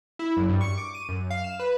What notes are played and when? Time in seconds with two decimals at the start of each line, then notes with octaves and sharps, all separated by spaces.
0.19 E4
0.37 F#2
0.49 G2
0.61 C#6
0.77 D6
0.95 D#7
1.09 F#2
1.30 F5
1.44 E7
1.59 B4